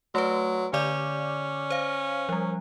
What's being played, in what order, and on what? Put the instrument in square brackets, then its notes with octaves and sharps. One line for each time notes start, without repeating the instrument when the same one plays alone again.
[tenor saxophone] F#3 [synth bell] A3 B4
[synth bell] D3 D5 D6 [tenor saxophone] C#4
[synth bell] C5 F5
F3 G3